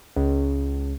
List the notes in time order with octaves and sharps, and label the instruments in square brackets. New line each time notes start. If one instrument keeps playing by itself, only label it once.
[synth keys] C#2